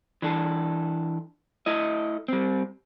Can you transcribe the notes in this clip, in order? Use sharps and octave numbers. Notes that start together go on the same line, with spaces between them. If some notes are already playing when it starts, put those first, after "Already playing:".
E3 D4 A4
A3 E4 D#5
G3 C4